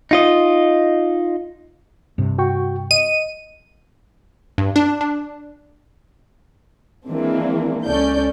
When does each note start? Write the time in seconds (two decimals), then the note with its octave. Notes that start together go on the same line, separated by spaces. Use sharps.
0.11 D#4 F4 D#5
2.18 G2 C3
2.38 F#4 G5 C#6
2.91 D#5 D#7
4.58 G2
4.76 D4
5.01 D4
7.07 E3 G#3 A#3 C4 D4
7.86 C#2 C#4 A4 D5 G6